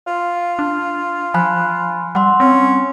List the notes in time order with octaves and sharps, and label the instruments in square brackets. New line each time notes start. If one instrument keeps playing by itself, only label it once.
[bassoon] F4
[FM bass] D4
[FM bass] F3 [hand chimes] G#5 B5 F#6
[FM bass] G3 [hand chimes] F#5 C6 E6
[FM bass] C4 [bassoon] C#4